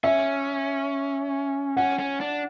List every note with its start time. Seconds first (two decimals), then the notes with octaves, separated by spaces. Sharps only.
0.04 C#4 E5
1.77 C#4 F#5
1.99 C#4
2.21 D4